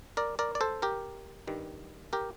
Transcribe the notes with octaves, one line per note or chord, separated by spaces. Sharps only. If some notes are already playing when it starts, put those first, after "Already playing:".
A#4 D5
A#4 D5
D5
A4 C5
G4 A#4
G2 D#3 G3
G4 A#4